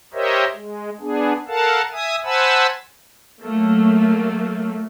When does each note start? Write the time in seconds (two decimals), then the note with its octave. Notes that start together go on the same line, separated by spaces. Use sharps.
0.14 G4 A#4 C5 C#5 D#5 E5
0.53 G#3
1.00 B3 D4 G#4
1.48 A4 A#4 F5 F#5 A5
1.92 E5 G#5 D#6
2.25 C5 F#5 G#5 A5 B5 E6
3.41 F#3 A3 A#3